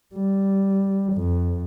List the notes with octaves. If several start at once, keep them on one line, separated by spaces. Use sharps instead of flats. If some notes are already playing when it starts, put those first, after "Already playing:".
G3
F2